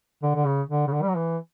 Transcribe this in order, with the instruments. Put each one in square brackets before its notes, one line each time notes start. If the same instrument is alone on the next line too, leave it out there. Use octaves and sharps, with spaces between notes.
[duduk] D3
D3
C#3
D3
C#3
D3
G3
F#3
E3